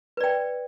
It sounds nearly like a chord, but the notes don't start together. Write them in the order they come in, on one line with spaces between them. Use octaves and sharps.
B4 D5 G5